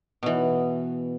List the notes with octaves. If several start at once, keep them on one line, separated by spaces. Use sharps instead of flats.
B2 E3